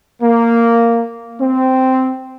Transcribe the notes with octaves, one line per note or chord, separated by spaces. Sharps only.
A#3
C4